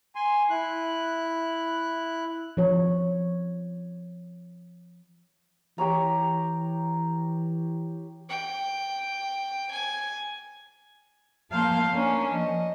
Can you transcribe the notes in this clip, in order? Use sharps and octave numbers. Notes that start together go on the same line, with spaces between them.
G#5 C6
E4 F#6
F3 C#5
E3 G4 C#5 A#5
G5
G#5
F3 A#3 F5 A5 C6 G6
A#3 C#4 D4
F3 D#5